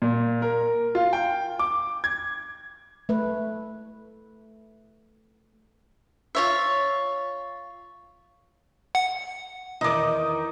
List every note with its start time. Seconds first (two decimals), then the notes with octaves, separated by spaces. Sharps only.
0.02 A#2
0.42 A#4
0.95 F4
1.13 G5
1.59 D6
2.04 G#6
3.09 A3 B4
6.35 F4 C#5 E5
8.95 F#5
9.81 E2 D#3 D#4 D#5 D6